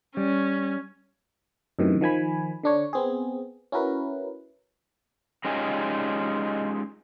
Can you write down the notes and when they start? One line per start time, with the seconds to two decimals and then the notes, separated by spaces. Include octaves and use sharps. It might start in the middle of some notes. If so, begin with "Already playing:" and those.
0.17 G3 C#4
1.79 F#2 A2 C3 D#3 E3
2.01 D#3 F3 G#5 B5
2.63 D3 D4 C#5
2.93 B3 C4 G#4
3.72 C#4 E4 F#4 A#4 B4
5.45 G#3 C#4 D#4 F4 G4 G#5